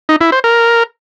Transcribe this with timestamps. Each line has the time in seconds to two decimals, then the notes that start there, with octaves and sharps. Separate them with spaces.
0.09 D#4
0.21 E4
0.32 C5
0.44 A#4